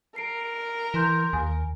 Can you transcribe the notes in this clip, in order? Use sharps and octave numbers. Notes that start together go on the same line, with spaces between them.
A#4 C7 D7
E3 A#5 C6 G6
D#2 G#5